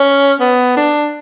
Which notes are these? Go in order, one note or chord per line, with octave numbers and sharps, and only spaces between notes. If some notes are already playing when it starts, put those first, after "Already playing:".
Already playing: C#4
B3
D4